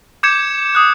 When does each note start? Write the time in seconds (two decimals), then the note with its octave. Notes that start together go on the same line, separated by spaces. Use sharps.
0.23 D6 G6 G#6 C#7 E7
0.75 D#6 F#6